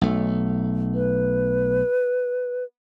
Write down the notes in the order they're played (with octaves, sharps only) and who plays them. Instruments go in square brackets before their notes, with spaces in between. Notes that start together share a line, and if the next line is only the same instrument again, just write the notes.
[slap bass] B1 A3
[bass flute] B4